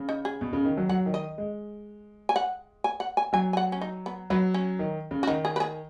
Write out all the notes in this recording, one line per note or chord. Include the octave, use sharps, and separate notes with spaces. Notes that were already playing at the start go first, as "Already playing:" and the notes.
Already playing: C#3
D#4
G#4
B2
C#3
D#3
F#3
F#3 F#5
D#3
D#5
G#3
G#5
F#5
G#5
F#5
G#5
F#3 G#5
G#5
F#5
C#4
D#4
B3
F#3 B3
C#4
D#3
C#3
F#4
D#3 D#4
G#4
B4
G#4